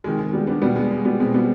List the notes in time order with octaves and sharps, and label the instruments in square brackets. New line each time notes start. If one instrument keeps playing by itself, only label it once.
[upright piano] C3 D#3 G#3
G#3
G3 B3
B3 D4
B2 G3 B3
G#3
G#3
G3 B3
B2 G#3 C4
G3 B3